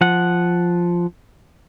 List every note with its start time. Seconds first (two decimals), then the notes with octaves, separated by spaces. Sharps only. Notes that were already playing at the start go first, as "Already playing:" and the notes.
0.01 F3 F#5